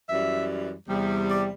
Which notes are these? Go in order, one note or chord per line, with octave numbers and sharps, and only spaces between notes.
F#2 E3 G3 E5
E2 C3 G3
D5